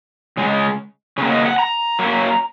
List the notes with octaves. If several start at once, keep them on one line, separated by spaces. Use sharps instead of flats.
C#3 G#3
C#3 F#3 A#3 C#4
D#5
F#5
A#5
F#2 F#3 A#3